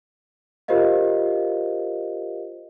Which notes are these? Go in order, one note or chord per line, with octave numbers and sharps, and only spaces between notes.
F4 G4 A#4 C5 D#5 F5